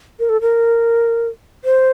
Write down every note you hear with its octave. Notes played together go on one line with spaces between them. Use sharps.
A#4
A4
A#4
C5